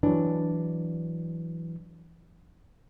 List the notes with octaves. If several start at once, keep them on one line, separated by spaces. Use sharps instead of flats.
E3 F#3 D4